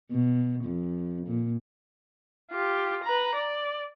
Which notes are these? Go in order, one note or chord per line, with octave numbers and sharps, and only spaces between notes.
B2
F2
A#2
F4 G4
B4 A#5
D5